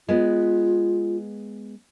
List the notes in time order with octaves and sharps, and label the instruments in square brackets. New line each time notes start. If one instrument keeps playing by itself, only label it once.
[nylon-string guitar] G#3 B3 [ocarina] F4